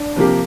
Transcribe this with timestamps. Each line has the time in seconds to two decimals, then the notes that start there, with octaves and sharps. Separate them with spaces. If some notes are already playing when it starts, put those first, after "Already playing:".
Already playing: D4
0.16 C3 F3 A#3 G4